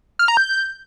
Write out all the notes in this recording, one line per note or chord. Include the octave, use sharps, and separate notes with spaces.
F6
A#5
G6